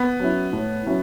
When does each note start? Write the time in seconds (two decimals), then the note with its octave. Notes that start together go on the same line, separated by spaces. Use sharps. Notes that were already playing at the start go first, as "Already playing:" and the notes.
Already playing: B3
0.20 F#3 C#4 E4
0.53 A2
0.86 F#3 C#4 E4